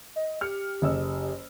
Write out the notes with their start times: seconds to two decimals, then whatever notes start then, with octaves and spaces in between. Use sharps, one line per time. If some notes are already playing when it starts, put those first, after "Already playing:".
0.16 D#5
0.41 G4 F6 C#7
0.82 F#1 D#5 E6